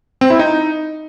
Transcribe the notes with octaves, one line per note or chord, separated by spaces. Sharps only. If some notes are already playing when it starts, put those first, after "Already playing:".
C4
E4
D#4